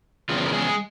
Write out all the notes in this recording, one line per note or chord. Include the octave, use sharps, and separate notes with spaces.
E2 C#3 F3 C4 F4
A#4
G#3 G#4